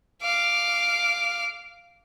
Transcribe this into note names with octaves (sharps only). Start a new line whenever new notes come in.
F5 D6